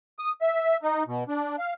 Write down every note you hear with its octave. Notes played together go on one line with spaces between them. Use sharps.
D#6
E5
D#4
B2
D4
F5